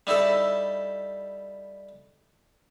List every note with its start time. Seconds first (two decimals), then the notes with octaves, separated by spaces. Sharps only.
0.07 G3 D#4 E4 A4